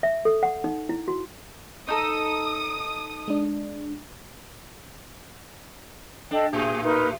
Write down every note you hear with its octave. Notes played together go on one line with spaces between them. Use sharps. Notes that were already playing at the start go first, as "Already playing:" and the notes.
E5
A4
F#5
D#4
E4
F#4
D#4 A4 D#6
G#3 D4
D4 A4 D#5 G5
A2 G4 G#4
D#4 A#4 B4